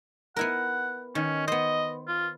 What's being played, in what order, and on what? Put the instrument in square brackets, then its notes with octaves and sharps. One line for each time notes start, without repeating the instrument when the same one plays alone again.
[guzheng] B3 E4 A#4 [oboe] F#5
[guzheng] D#3 [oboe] C#4
[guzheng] B3 C5 [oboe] D#5
[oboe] F4